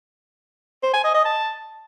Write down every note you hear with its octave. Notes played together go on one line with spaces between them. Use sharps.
C5
G#5
D#5
D#5
A5